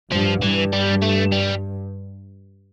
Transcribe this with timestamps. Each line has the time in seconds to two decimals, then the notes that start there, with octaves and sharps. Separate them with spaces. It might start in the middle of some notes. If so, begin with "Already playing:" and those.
0.12 G2 F3
0.41 G2 E3
0.73 G3
1.02 A3
1.32 G3